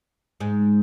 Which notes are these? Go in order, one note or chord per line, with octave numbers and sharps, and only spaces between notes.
G#2 G#3